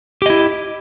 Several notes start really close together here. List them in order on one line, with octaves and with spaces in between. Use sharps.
G4 D#5 E4